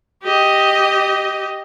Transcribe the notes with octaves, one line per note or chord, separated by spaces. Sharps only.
G4 D#5